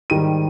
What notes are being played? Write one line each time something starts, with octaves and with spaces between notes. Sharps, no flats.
G#2 D#3 G3 D#7